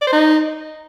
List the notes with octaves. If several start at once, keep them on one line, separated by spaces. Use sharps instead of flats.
D5
C5
D#4